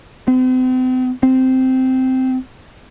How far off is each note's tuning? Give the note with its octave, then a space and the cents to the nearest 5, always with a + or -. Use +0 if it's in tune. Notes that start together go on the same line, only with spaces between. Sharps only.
C4 -40
C4 -10